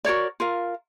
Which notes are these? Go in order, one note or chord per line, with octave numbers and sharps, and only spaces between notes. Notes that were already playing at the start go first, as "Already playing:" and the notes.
F#4 A#4 C#5 D5
F4 A#4 F5